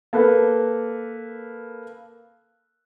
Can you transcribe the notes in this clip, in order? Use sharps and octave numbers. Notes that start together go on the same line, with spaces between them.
A#3 A4 B4